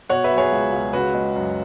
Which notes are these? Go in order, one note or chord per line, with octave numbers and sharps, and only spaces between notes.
B2 C#5 F#5
B4 E5
F#3
G#4 C#5
C#2
C#2
C#3 F#4 B4
G#3
F#2